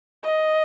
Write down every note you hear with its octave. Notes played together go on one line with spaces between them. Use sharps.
D#5